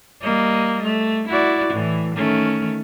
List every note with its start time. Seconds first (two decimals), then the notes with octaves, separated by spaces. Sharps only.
0.22 G3 A#3 D#5
0.83 A3
1.28 E4 F#4 D5
1.73 A2 E3
2.15 D#3 A3 C#4